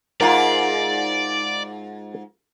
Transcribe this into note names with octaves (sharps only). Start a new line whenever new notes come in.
G#2 F4 A#4 D5 F5